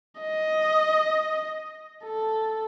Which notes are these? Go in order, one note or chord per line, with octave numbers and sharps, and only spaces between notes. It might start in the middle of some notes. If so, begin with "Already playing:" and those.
D#5
A4